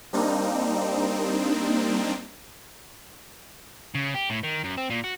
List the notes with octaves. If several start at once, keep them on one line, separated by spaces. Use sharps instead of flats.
G3 A#3 C4 D4 D#4
C#3
G4
A2
D#3
F#2
C4
A#2
F#4